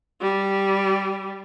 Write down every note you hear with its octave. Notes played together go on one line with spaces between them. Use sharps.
G3